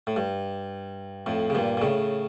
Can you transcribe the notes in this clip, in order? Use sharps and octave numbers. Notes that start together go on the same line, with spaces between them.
A2
G2
F2 A2
C#3
G2 A#2
A#2
A2 C#3